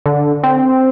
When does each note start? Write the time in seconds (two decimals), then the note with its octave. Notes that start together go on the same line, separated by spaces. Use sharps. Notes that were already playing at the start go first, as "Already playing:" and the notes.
0.06 D3
0.43 C4